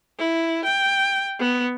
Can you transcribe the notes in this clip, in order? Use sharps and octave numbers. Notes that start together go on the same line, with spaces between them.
E4
G5
B3